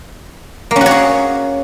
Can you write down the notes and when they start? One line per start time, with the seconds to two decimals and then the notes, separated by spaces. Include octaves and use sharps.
0.71 A#3
0.76 C#4
0.81 F#4
0.86 C#5
0.91 G#4